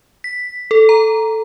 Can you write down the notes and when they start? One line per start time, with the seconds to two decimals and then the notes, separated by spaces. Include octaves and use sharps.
0.24 B6
0.71 A4
0.89 A#5